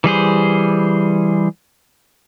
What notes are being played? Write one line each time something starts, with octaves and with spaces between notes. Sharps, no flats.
E3 G3 G#4 C5